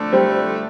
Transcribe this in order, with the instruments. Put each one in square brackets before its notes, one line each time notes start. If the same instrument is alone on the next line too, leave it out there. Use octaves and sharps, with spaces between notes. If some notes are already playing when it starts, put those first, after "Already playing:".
Already playing: [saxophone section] F2 D3 A3 D4
[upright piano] G3 C4